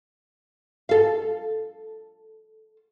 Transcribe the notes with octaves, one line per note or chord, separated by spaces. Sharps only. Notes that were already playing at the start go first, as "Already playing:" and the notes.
A4 F5